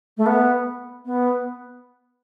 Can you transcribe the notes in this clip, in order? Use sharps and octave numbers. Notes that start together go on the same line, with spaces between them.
A3
B3
B3